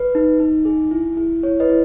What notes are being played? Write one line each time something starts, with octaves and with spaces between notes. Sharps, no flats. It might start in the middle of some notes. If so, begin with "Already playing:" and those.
Already playing: B4
D#4
D#4
G#4
E4
E4
E4 C#5
B4 D#5
E4